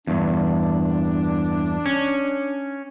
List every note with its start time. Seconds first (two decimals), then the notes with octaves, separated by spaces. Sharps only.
0.07 E2 G2 D4
1.86 C#4